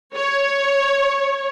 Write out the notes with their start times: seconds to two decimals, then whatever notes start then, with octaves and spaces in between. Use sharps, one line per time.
0.14 C#5